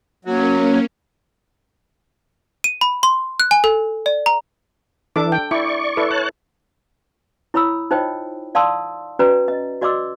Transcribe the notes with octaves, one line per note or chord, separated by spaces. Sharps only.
F#3 A#3 C#4
D#7
B5
C6
F#6
G#5
A4
D5
A#5
E3 D4 A4 D6
G5
E4 D5 C#6
E4 A4 B4
C#5 A5 F#6
E4 C#5 B5 D#6 E6
D#4 F4 C5 C#5 D#5 G5
D5 F5 A5 C6 D#6 E6
C#4 F#4 B4 D5 A#5
D#5
F#4 D5 D#5 C6 D6 E6